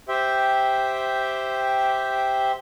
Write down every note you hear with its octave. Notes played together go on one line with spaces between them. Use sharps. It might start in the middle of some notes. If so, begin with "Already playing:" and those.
G4 C5 E5 G5